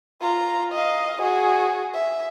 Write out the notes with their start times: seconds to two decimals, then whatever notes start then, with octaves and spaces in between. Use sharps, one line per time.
0.21 F4 A#5
0.73 D#5 F5
1.21 F#4 G#4
1.94 E5